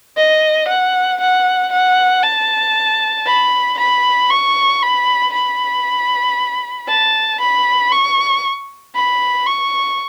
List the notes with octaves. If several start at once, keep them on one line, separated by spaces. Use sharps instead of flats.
D#5
F#5
F#5
F#5
A5
B5
B5
C#6
B5
B5
A5
B5
C#6
B5
C#6